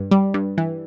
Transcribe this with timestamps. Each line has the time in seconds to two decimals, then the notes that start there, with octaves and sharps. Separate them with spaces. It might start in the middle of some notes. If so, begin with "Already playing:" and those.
Already playing: G2
0.11 G3
0.34 G2
0.58 E3